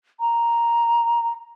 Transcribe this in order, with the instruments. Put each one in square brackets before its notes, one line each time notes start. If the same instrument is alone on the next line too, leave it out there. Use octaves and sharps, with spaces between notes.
[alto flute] A#5